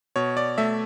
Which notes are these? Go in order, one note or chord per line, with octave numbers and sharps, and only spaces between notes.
B2 C#5
D5
A3 E5